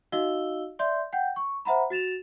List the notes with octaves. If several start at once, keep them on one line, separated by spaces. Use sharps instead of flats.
D#4 F#4 D#5 F5 E6 G7
D5 E5 C6 G6
F#5 G5 G6
C#6
C5 E5 F#5 A#5 B5
F#4 A6 E7 F7